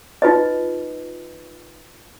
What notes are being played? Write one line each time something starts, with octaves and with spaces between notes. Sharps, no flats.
D#4 F4 B4 D#5